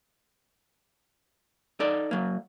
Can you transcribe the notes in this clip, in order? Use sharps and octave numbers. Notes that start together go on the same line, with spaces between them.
D#4 A4 D5
F#3 A#3